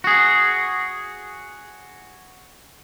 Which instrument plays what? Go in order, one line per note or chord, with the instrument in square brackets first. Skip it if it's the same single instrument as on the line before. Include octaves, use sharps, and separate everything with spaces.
[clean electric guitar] F#4 G#4